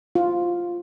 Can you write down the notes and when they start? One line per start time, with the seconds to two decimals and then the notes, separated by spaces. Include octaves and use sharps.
0.15 F4